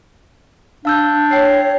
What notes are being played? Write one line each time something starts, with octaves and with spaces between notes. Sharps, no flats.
D4 F5 E6 G6
C#5 G5 C7